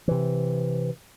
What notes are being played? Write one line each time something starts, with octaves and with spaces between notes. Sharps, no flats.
C3 E3